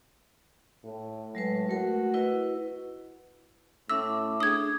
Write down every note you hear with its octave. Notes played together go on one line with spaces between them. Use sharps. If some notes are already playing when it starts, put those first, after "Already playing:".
A2
A2 F#3 G#3 B4
A3 F#4 A#4
E4 B4 D#5
A2 C#4 E5 D6 E6
D4 G#4 D#6 G#6